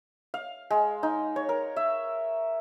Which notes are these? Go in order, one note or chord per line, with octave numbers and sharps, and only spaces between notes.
F5
G#3
D#4
C#5
A#4
E5